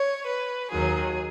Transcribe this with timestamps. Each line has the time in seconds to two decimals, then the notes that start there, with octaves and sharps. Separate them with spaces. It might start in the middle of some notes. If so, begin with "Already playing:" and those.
Already playing: C#5
0.28 B4
0.71 D#2 D#3 F#3 G#4